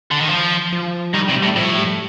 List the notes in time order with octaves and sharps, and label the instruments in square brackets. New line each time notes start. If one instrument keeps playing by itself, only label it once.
[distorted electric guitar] D3
D#3
F3
[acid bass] F3
[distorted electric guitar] D#3 [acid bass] G3
[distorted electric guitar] C3
[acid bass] G3
[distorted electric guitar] A2
[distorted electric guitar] A2 [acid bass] F3
[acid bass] G3